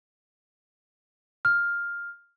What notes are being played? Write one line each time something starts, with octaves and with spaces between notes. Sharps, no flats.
F6